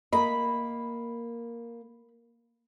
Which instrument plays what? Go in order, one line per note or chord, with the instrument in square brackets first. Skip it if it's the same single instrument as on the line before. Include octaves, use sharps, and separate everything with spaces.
[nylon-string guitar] A#3 D#5 [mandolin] B5